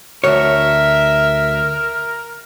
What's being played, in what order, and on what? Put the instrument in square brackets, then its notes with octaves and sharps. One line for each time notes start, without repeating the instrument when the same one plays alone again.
[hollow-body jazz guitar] D2 C#5 [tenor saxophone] A#4 [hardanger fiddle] E5